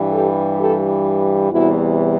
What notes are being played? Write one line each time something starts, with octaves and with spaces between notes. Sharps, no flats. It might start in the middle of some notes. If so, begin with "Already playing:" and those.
Already playing: G2 E3 G3
G4 A4
G4 A4
E2 C3 E3 G3 E4 F#4